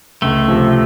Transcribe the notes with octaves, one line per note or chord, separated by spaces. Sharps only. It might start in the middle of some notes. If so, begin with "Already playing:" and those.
C#2 A3
C3 F3